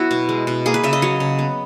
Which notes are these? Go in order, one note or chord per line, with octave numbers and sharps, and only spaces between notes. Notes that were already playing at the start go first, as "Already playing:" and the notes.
Already playing: F#3 B3 E4 F#4
B2
G#3
B2
A#3 G#4
B4
C#3 E5
D#5
F#3 C#5
C#3
B3